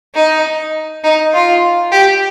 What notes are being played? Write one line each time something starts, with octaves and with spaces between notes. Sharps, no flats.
D#4
D#4
F4
G4